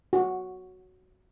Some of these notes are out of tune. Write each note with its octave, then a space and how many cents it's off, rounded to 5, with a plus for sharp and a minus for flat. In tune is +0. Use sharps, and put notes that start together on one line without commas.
F#4 +0